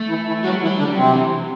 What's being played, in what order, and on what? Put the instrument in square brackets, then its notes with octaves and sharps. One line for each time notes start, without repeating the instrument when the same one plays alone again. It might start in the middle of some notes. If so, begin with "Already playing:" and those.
Already playing: [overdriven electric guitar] A3
[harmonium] E3 E4
E3 E4
[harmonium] F#3 F#4 [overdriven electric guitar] G3
[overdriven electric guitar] F#3
[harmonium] E3 E4
[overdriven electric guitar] G3
[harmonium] D3 D4
[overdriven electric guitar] G3
[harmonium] C3 C4 [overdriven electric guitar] F#3
[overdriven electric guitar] E3
C3